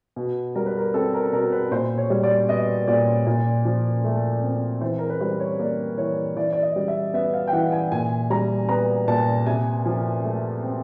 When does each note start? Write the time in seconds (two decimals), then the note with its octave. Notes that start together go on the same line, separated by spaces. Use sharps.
0.16 B2
0.55 G3 A#4
0.66 B4
0.78 A#4
0.94 C4 A4
1.14 A#4
1.32 B2 A#4
1.52 B4
1.71 A#2 C5
1.98 C#5
2.10 G3
2.23 D5
2.49 B3 D#5
2.88 A#2 D5
3.27 A#2
3.65 F3
4.04 A3
4.43 C4
4.81 E3 C5
4.99 A#4
5.10 B4
5.20 G3 C5
5.40 C#5
5.59 A#3 D5
5.98 E3 C#5
6.36 E3 D5
6.53 D5
6.63 D#5
6.76 G3
6.88 E5
7.14 B3 E5
7.34 F5
7.47 G5
7.53 E3 F#5
7.72 G#5
7.92 A#2 G#5
8.30 G3 A#5
8.69 B3 A#5
9.08 A#2 A5
9.46 C3 G#5
9.86 F3
10.24 A3
10.63 C4